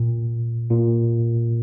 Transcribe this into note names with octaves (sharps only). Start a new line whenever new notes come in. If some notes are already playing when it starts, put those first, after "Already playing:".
Already playing: A#2
A#2